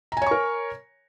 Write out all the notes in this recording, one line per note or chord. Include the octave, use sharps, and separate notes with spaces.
A#4 C#5 G#5 A#5 C#6